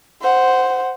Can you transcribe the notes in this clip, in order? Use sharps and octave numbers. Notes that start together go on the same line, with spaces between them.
C5 F#5